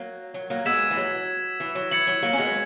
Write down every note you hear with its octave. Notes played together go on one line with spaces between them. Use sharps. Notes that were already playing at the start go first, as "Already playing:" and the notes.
Already playing: F#3 A#3
F#3
F#3 A#3
G#3 B3 E6 G#6 B6 E7
E3
F#3
E3
F#3
E3 G#6 C#7 F#7
F#3
F#3 A#3
C#4
G#3 B3